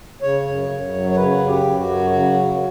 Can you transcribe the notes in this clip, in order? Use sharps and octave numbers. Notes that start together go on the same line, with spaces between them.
C#3 C#5
F#2
F#2
F#3
C#5
C#3 B4
F#2
G4
F#2
F#4
F#3
C#3 F#4
F#2